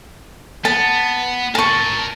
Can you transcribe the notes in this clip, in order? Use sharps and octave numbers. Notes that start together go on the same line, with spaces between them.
B3 A5
A#4 G#5 A5 C#6